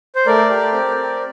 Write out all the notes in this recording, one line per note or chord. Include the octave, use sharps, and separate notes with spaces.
C5
A3 A#4 D5
G4
C4